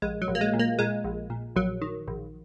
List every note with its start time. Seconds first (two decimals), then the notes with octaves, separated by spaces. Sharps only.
0.02 A#1 G#3
0.22 F#3
0.28 A#1
0.35 A#3
0.41 G#3
0.53 A#2
0.59 A#3
0.79 A#2 G#3
1.04 A#1
1.30 A#2
1.56 A#1 F#3
1.82 D#3
2.08 A#1